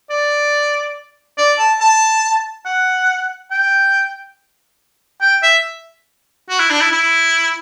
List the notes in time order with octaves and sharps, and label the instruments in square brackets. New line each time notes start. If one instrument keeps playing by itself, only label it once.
[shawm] D5
D5
A5
A5
F#5
G5
G5
E5
F#4
E4
D4
E4
E4